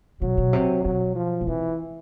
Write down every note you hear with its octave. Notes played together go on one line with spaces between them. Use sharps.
B2 F#3
B2
C3
B2 F#3
F3
B2
C3 E3